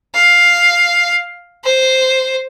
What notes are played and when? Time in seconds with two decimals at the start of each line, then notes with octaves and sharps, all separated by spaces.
0.14 F5
1.64 C5